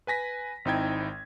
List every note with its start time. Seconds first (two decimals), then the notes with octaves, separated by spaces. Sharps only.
0.07 B4 G#5 A#6 B6
0.65 G#1 C4 D#4 E4 G5 G#6